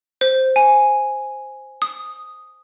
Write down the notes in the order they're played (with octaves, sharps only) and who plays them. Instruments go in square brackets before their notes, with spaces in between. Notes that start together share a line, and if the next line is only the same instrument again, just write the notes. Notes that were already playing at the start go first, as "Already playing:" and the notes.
[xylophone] C5
G#5
D#6